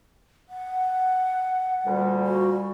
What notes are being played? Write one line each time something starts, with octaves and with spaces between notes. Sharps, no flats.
F#5
D2 A#2 G3
F#4